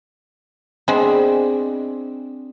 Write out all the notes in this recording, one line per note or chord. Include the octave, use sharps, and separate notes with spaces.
G#3 B3 C4 D4 G#4